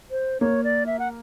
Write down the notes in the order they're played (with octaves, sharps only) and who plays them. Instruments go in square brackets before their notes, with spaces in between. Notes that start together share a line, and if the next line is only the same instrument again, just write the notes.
[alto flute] C5
[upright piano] A#3 [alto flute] C#5
[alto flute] D5
E5
F#5